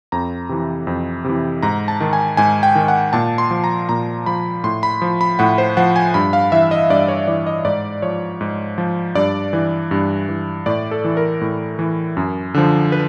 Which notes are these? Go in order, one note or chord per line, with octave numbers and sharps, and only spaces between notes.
F2 A#5
C3 E3
F2
C3 E3
G#2 A#5
A5
D#3
G#5
G#2 G#5
G5
D#3
F#5
A#2 A5
C6
F3
A#5
A#2 A#5
F3 B5
A2 C6
B5
F3
B5
A2 F#5
C5
F3 F#5
G#5
G2 B5
F5
E3 E5
D#5
G2 D5
C#5
E3 D5
D#5
G#2 D5
F3 C#5
G#2
F3
G2 D5
E3
G2
E3
A2 D5
A4
E3
A#4
A2
E3
F#2
D3 F3
B4